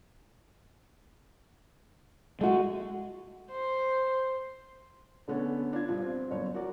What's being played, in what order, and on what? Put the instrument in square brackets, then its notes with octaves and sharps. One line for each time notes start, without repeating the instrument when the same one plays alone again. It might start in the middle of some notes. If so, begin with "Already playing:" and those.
[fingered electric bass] G#3 [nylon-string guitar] A3 F#4
[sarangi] C5
[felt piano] D3 A3 B3 C#4 D4 C#5
D4 F4 G#6
G2 F3 F4
C4
G1 F#2 C#5
F#4 A#4 D5